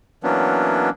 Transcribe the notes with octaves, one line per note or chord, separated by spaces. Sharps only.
E3 F#3 A#3 B3 C#4 D4